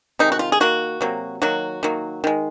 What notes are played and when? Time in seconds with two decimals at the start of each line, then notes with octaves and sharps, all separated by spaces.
0.19 C3 D#3 G#3 D#4
0.32 F#4
0.39 F4
0.52 G#4
0.60 D#3 A#3 F#4
1.01 C3 F#3 A#3
1.42 D#3 F#3 A#3 F#4
1.83 D#3 F#3 A#3
2.24 D#3 G#3